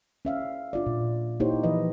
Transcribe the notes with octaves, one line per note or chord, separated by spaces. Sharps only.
C#4 E5 F5
D4 F4 D5
A#2
A#3 D#4 E4 G4 C5 C#5
E3 F3 B4 D#5